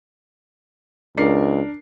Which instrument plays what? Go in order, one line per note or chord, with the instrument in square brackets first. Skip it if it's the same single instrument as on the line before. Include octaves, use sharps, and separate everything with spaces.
[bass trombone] C#2 [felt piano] D4 A#4 C7